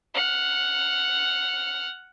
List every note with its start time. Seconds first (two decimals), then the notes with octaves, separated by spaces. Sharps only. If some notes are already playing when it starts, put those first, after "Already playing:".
0.14 F#5 F6